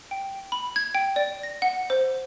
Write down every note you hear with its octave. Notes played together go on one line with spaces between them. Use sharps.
G5
B5
G#6
G5
D5
A#6
F#5
C5